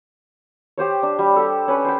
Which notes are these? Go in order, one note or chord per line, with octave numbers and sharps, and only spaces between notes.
G4 C5 C#5
D4
G3
G4 A4
C#4 B4
C5 G5